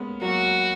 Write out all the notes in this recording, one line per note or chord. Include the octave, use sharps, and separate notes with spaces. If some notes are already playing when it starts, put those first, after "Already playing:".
Already playing: G#3 A#3 B3 C#4
F#3 A#3 F#4